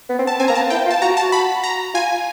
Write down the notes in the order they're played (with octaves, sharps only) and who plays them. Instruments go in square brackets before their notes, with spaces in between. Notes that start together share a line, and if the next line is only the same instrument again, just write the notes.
[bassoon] B3
C4
[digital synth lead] A5
[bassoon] C4 [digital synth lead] G#5
[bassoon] A#3 [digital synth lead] A#5
[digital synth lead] A5
[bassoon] B3
[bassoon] E4 [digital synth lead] G5
[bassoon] F4
[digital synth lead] A5
[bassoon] F#4 [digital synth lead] A#5
[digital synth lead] A5
[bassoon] F#4
[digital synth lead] B5
A#5
[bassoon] F4 [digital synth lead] G#5